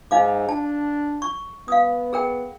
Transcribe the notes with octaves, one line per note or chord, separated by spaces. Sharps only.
G#2 D#4 F5 D6
D4 A5
C#6
B3 F5 D#6
G#4 A#4 G5